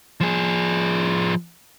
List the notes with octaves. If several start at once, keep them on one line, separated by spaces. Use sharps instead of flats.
F3 G#4